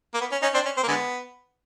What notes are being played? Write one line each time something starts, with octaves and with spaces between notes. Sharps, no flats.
A#3
B3
C#4
C#4 D#4
C4 D4
C#4
C4
A#3
D3 G#3 B3